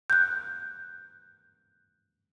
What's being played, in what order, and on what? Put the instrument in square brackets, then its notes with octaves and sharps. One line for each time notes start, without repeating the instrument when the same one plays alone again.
[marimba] F#6 G6